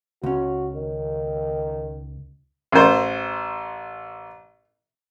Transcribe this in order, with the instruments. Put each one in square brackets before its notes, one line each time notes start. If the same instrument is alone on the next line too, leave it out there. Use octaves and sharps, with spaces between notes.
[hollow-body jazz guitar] C#2 C#4 [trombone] F#4
[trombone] D#3
[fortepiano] A1 C5